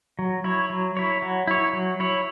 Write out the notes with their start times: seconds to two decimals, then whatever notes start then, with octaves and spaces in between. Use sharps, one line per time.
0.19 F#3
0.44 E4 C#5
0.70 F#3
0.97 E4 C#5
1.22 F#3
1.47 E4 C#5
1.73 F#3
2.00 E4 C#5